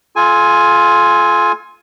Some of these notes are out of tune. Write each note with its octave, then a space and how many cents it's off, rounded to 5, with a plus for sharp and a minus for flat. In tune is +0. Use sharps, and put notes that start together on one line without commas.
F4 +0 A4 -40 G#5 +0